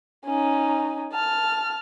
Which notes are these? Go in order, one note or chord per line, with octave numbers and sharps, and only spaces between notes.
C#4 D#4
A5 F6